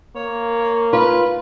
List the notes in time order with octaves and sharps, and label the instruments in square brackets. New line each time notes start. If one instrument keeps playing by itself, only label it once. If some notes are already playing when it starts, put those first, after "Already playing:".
[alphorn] A#3 [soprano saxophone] C#5
[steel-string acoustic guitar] F4 [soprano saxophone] B4